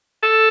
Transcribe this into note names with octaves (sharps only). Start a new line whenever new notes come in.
A4